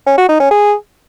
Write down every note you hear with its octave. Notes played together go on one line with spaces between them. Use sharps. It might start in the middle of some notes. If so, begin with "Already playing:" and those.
C#4
F#4
D#4
C#4
G#4